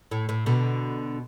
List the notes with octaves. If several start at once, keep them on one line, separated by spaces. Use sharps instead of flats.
A2
A2
B2 D3